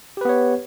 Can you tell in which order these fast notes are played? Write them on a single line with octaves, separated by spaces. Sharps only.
G4 B4 B3 C#5